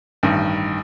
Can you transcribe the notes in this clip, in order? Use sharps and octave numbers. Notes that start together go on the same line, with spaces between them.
A1 G2 D#3